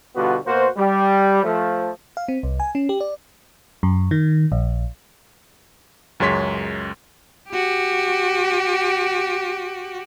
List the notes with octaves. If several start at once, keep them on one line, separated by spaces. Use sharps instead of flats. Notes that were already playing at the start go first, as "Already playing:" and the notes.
B2 D3 G3 B3 F4 F#4
B2 A#3 F#4 C5
G3
F3 A3
F5
C4
C2
G#5
C#4
G4
D5
F#2
D#3
A#1
C#2 F#2 G#3 C#5 C6 B6
F#4 G4